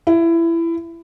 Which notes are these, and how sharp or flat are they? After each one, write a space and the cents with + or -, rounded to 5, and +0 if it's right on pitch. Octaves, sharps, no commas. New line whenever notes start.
E4 +20